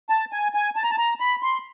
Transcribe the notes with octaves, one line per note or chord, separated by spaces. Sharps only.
A5
G#5
G#5
A5
A#5
A5
A#5
B5
C6